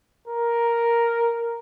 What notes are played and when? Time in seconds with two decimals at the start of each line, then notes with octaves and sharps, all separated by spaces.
0.27 A#4